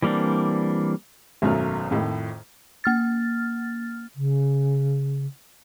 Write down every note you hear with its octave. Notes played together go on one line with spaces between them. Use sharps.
E3 G3 A#3 C4 D4
G#1 F#2 B2 F#3 A3 F6
F2 A2 D#3
A#3 F6 A6
C#3